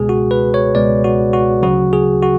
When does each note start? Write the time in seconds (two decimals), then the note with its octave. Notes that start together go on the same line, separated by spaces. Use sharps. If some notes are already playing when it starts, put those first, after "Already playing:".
Already playing: C#2 B2 G#3 G#4
0.09 F#4
0.31 B4
0.54 C#5
0.75 C#2 B2 G#3 D5
1.04 F#4
1.33 F#4
1.63 D2 C#3 F#3 F#4
1.93 G#4
2.22 F#4